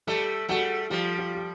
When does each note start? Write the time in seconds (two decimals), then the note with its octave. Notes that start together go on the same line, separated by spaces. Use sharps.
0.07 G3 A3 G4 A4
0.49 G3 A3 F#4 G#4
0.90 F3 G3 F4 G4
1.18 F4 G4
1.35 G4